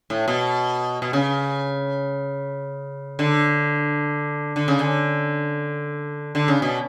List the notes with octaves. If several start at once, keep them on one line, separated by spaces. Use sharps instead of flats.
A2
B2
B2
C#3
D3
D3
C#3
D3
D3
C#3
B2